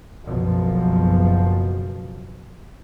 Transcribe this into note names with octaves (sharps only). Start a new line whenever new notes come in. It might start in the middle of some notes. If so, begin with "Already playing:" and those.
F#1 B1 F#2 B2 F3